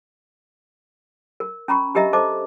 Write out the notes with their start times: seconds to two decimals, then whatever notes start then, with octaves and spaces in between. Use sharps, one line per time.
1.40 A#4
1.68 C#4 A#5 B5 C#6
1.95 D4 G4 A#4 D#5 E5 A#5
2.13 A4 C5 D#5 A5 D6